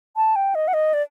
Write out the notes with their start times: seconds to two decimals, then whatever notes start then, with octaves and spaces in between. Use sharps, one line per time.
0.16 A5
0.36 G5
0.55 D#5
0.68 F#5
0.74 D#5
0.94 D5